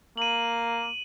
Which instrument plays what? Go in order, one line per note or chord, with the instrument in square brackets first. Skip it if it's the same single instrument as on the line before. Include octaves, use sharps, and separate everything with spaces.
[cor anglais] A#3 [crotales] D#7 F#7